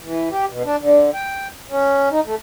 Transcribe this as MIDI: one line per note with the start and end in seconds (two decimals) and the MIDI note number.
0.04 0.29 52
0.31 0.45 67
0.50 0.63 47
0.65 0.76 62
0.80 1.10 50
1.14 1.48 79
1.70 2.09 61
2.11 2.20 63
2.26 2.35 57